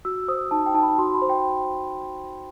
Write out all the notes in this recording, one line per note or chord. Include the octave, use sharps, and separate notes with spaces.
F#4 E6
C5 D#6
D#4 A5
G5
D#4 A5
B5
F#4 C6
B5
C5
G5